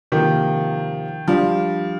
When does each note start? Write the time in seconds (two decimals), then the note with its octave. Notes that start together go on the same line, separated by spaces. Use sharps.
0.12 C3 D#3 F3 A#3
1.28 F3 G3 D4 F4